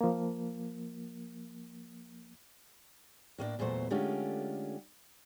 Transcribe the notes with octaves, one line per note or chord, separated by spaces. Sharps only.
F3 A#3
A2 A#3 B3 D4
E2 A#2 F#3 A3 C5
D3 G#3 A3 C#4 F4 G4